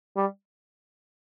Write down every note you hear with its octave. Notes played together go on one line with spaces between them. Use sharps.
G3